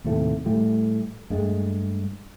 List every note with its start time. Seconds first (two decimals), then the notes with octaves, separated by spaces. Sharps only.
0.04 D#2 A2 C3 A3
0.45 A2 G3 A3
1.30 G2 G#3 A3